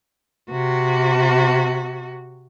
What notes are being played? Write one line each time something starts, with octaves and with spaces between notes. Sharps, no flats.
C3 F#4